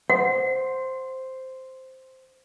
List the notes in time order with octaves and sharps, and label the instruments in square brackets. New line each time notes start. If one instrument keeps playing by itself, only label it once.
[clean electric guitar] C5 [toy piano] F#5